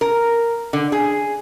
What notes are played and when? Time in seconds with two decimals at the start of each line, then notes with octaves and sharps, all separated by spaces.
0.01 A#4
0.73 D3
0.92 G#4